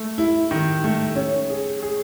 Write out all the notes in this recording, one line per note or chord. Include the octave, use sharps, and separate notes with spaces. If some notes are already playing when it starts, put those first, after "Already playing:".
Already playing: A3
E4
D#3
A3
C#4
G#4
G#4